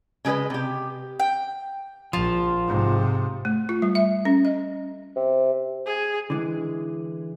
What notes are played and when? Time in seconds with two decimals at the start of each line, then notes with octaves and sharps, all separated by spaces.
0.25 C#3 G#3 G#4 B4 D#5
0.50 C3 G4
1.20 G5
2.13 A#1 F3 F4
2.67 G#2 C3
3.45 A3
3.69 F4
3.82 G3
3.95 E5
4.25 C#4
4.45 D#5
5.16 C3
5.86 G#4
6.30 D3 E3 G#3